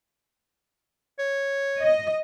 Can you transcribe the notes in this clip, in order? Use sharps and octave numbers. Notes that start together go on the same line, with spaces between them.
C#5
D#5